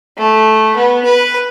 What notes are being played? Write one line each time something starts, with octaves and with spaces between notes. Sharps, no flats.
A3
B3
B4